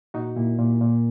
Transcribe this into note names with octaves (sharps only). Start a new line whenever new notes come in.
A#2 D#4 F#4
A#2 E4
A#2
A#2